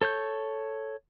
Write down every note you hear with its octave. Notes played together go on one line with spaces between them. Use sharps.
A4 C#5 C#6 G6